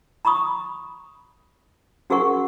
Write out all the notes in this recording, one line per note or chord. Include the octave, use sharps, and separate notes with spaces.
A#5 B5 C#6 D#6
C#4 F#4 G#4 A#4 F#5 C#6